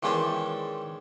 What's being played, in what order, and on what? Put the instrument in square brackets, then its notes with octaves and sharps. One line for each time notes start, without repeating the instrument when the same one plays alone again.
[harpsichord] D#3 E3 G#3 C#4 C5 D5